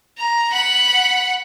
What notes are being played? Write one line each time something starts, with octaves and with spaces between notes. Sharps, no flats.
A#5
F#5 B5